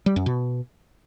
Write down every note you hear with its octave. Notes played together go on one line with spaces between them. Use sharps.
G3
F#2
B2